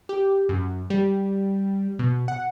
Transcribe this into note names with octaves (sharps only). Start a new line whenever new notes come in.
G4
F#2
G3
B2
F#5